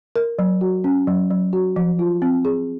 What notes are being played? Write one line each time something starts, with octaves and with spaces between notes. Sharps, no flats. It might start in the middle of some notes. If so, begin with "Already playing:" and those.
A#4
F#3
F#4
C#4
F#3
F#3
F#4
F3
F4
C4
G#4